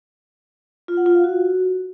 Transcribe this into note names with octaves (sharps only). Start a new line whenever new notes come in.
F4
F#5
F4
F5
F#4